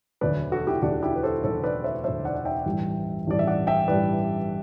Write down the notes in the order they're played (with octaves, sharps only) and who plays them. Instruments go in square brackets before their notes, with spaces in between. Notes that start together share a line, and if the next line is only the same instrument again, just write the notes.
[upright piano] E1 D2 D3 F#3 B4 D5
F#4 A4
E4 G4
E1 D2 D3 F#3 D4 F#4
E4 G4
B4
A4 C5
E1 D2 D3 F#3 A4 C5
B4 D5
C5 E5
E1 D2 D3 F#3 C5 E5
D5 F#5
F#5
E5 G5
A1 G2 E3 G3
A1 G2 E3 G3 D5
E5
D5 F#5
E5 G5
A1 G2 E3 G3 B4 D5